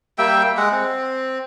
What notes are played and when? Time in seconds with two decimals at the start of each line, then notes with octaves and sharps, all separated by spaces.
0.18 G3 A#3 E5 G5
0.57 G#3 F#5
0.72 C4